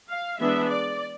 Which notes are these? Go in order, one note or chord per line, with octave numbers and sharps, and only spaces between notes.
F5
E3 G#3 B3 D4 E5
D5